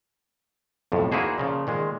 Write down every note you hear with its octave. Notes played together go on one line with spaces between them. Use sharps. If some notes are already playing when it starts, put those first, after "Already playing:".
B1 F2 A2
A#3 D#4 E4 F#4 G#4 C5
A#2 C#3 F3
A#2 D#3 G#3